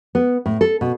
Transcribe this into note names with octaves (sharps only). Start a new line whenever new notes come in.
B3
A2
A4
B2